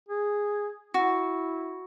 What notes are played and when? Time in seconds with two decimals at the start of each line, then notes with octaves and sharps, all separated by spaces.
0.09 G#4
0.94 E4 F#4